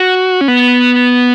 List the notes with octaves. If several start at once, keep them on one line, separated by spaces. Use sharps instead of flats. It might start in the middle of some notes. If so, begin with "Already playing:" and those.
Already playing: F#4
C#4
B3